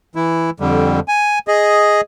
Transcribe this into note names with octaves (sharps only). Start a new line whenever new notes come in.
E3 E4
F2 D3 G3
G#5
G#4 D#5